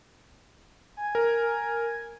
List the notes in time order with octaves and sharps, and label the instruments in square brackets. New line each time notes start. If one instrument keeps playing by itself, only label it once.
[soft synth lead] G#5
[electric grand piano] A#4